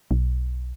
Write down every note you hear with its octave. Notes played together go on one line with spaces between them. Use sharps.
B1